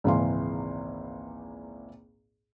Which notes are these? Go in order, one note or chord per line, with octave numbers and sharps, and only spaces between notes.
G#1 C#2 A#2 E3 F5 C6